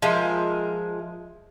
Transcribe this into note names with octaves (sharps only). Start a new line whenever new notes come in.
F3 G#3 A#4 E5